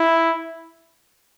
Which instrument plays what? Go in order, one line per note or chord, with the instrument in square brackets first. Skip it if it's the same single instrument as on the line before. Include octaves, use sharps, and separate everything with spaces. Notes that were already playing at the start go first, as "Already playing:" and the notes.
Already playing: [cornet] E4